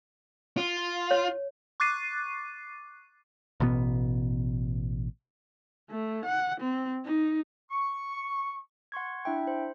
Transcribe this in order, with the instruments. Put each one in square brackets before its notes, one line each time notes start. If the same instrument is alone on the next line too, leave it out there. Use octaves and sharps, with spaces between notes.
[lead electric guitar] F4
[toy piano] C#5
[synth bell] C#6 D6 F#6 A6 C7 D#7
[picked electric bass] A1 B2 B3
[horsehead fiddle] A3
F#5
C4
D#4
[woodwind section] C#6
[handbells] F#5 C6 C#6 G#6
D4 E4 E5 G5
C5